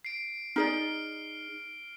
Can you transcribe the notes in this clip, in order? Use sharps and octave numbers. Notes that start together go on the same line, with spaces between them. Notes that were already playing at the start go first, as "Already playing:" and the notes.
C7 D7
D#4 G#4 D5 F6 C7 D7